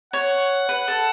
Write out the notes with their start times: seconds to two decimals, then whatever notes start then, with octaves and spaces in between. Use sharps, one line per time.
0.13 C#5 F#5
0.69 B4
0.88 A4